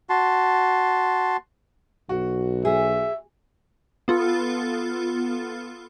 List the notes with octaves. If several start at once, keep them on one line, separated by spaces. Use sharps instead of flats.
F#4 A5 C6
B1 F#4
G#4 E5
B3 F4 A4